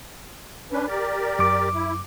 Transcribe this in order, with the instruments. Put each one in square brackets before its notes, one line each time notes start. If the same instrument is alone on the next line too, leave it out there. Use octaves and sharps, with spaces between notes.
[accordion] C#4 D4 B4
G4 A#4 D5
[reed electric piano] F#2 D6
[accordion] E4